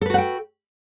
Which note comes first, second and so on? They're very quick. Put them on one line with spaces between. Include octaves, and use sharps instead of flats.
A4 B4 F#4 F#5 G5